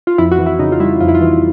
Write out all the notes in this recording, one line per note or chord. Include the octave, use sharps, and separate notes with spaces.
F4
F2 E4
F#4
E3
E4
C#3 D#4
F4
G3 E4
F2 F4
E4
F4
E3